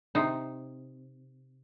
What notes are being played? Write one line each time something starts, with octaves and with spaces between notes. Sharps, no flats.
C3 D#4